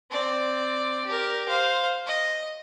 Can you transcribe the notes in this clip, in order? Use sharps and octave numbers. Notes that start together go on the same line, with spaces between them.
C4 D5
G4 A#4
C5 F5
D#5